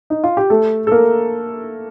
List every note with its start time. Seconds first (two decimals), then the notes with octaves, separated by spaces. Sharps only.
0.10 D#4
0.24 F4
0.37 G4
0.50 A3 A4
0.87 A4
0.92 A#3 A#4